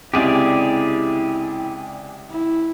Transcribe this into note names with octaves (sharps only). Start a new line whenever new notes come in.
C#2 C3 E4 G4 G#4 D5
E4